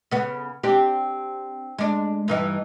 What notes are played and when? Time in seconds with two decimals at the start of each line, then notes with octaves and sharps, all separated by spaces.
0.11 C#3 B3
0.63 C4 D4 G4
1.79 G#3 D4
2.28 G2 E3 D#4